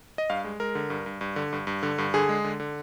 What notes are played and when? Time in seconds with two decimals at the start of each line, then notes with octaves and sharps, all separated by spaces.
0.18 D#5
0.30 G2 F5
0.45 G#3
0.60 G#3 A#4
0.75 D3
0.90 G2
1.06 G2
1.21 G2
1.36 D3
1.53 G2
1.67 G2
1.83 D3
1.98 G2
2.14 D3 G#4
2.29 G#3
2.44 D3
2.60 D3